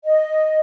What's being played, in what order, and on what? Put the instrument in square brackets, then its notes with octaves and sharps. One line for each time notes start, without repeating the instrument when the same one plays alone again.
[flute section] D#5